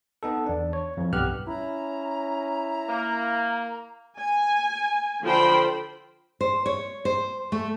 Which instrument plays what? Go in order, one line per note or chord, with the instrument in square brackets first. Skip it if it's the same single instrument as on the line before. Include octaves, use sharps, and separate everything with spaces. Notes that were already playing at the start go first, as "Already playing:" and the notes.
[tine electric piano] B3 D#4 A4
E2 D4
C#5
F2 E3
B1 G2 B3 G4 F6 F#6
[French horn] C#4 [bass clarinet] E4 [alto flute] A#5
[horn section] A#3
[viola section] G#5
D3 F3 C5 G5 B5 C6
[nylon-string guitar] C5
C#5
C5
A3